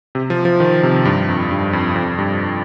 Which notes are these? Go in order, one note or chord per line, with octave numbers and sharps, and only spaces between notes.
C3
F3
F3
D#3
C3
G2
F2
G2
F2
F2
G2